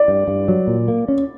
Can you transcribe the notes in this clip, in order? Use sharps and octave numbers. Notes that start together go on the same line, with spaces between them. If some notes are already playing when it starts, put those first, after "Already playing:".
Already playing: D5
G2
G2
F#3
A#2
A#3
C#4